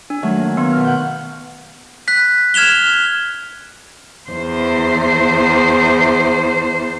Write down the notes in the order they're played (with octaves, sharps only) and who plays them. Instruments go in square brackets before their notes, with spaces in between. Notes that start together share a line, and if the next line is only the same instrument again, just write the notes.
[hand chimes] D4
[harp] D#3 F#3 A3
A#3
[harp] D#3 [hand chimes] B3
[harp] B2 F6
F#5 G6
[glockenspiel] F#6 B6
F6 G#6 E7 F7 G7
[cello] E2 C5